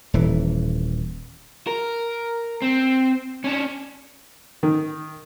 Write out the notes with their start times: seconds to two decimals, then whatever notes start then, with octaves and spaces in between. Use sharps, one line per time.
0.14 D#1 E3
1.67 A#4
2.62 C4
3.44 C#4 D4
4.63 D#3